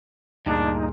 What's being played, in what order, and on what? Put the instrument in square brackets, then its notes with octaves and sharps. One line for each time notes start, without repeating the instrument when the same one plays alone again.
[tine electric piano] D2 G#4 [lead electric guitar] G2 A#2 [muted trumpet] D4 [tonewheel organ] D#4